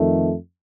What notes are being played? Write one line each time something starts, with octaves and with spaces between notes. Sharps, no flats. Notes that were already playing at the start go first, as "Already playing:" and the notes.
Already playing: F2 D#3 A3